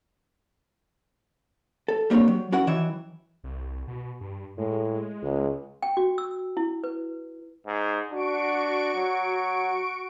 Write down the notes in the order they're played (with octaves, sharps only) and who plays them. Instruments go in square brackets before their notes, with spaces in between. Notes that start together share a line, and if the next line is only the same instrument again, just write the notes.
[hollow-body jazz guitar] A4
G3 A#3 C4 D4 C#5
F#3
C#4 E4 F#4 A#4 F#5
D#3 E3 F#3 E5
[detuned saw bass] C2
B2
G2
[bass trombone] A2 [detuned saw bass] G#3
[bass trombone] C#2
[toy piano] G5
F#4
E6
E4
B4
[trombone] G#2
[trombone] D4 [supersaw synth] F#4 C#6 D7
[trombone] F#3